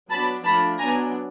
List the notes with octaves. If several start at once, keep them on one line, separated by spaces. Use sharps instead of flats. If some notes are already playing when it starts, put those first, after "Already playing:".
F#3 B3 D4 A5 B5
F3 A3 D4 A5 B5
F#3 B3 D4 G#5 A#5